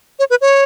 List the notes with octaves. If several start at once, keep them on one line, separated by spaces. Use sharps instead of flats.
C#5
B4
C#5